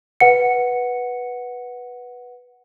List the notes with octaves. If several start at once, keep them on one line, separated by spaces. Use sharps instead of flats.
B4 F#5 C#7